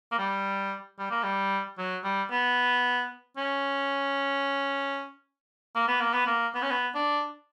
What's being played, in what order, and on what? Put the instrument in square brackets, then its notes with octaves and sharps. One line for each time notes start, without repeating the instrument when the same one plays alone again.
[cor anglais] A#3
G3
G3
A#3
G3
F#3
G3
B3
C#4
A#3
B3
A#3
B3
A#3
B3
C#4
B3
D4